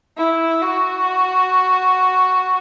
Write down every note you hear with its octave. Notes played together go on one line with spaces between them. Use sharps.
E4
F#4